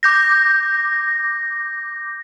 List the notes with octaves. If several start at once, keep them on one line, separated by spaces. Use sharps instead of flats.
D6 G6 A#6